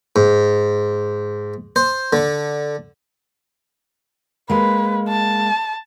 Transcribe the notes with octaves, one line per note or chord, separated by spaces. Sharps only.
G#2
C5
D3
G#3 A#3 B4
A5